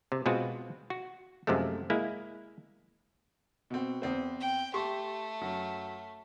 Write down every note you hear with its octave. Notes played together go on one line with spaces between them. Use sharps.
C3
B2 G#3 C4 F4 F#4
F#4
F#2 C3 F3 G#3 A3
G#3 A#3 E4
B2 C4
E2 C4 C5
G5
A3 G4 C6 C#6
F#2